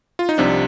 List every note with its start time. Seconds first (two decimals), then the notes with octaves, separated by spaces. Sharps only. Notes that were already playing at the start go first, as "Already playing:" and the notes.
0.19 F4
0.29 D#4
0.38 C2 C3 F3 D4